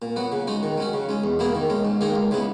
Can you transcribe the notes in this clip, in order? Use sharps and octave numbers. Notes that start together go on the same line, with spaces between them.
A#2
F#3 B3 F#4
C#3
G#3 D#4 F#4
D#3
F#3 C#4 F#4
C#3
G#3 C#4
E2
B2 A#3 E4 G#4
D#3
G#3 C#4
G#2
D#3 A#3 D#4 G#4
C#2
C#3 G#3 B3 E4